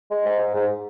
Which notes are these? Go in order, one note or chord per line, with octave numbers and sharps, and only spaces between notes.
G#3
G#2
G#2
G#2